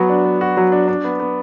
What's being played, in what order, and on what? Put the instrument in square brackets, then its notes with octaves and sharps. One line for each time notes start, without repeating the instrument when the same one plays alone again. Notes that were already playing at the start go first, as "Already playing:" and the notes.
Already playing: [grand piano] F#3 B3 F#4
D4
B3
F#4
F#3
D4
D4
B3
B3